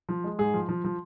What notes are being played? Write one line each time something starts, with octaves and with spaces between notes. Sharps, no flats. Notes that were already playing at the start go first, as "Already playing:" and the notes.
F3
G#3
G#2 G#4
F3
F3
F3